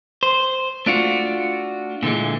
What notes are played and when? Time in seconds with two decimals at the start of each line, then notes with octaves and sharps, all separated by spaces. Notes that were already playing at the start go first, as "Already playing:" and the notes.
0.23 C5
0.86 A3 D4 F4 F#4
2.03 A#2 D3 E3 G#3